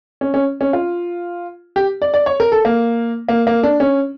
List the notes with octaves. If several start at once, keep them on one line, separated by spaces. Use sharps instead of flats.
C#4
C#4
C#4
F4
G4
D5
D5
C#5
A#4
A4
A#3
A#3
A#3
D4
C#4